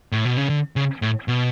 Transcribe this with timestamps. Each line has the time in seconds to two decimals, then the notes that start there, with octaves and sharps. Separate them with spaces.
0.12 A2
0.25 B2
0.37 C#3
0.50 D3
0.76 C#3
1.02 A2
1.28 B2